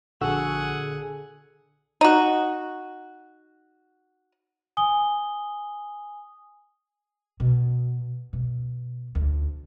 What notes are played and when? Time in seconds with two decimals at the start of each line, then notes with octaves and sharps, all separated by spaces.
0.21 A#1 D3 F#4 G#4 A4 F#5 E6
2.01 D#4 F#4
4.77 G#5 D#6 G7
7.40 B2
8.33 B2
9.15 D2